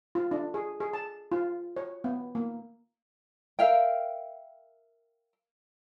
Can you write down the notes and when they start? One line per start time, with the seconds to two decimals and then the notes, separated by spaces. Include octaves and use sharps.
0.15 F4
0.31 D4
0.54 G#4
0.80 G#4
0.93 A5
1.32 F4
1.77 C#5
2.04 B3
2.35 A#3
3.59 A#4 E5 F5 G5